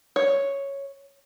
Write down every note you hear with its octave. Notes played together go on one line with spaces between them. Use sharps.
C#5